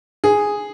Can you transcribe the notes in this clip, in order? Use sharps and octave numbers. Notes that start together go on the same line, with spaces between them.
G#4